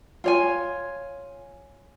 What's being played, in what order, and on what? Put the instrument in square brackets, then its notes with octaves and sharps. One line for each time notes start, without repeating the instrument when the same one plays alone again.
[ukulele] F4 C#5 G#5